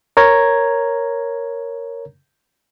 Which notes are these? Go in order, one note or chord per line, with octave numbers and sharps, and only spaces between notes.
A#4 C#5 A#5 G#6